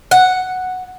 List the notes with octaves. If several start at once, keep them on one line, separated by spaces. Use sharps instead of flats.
F#5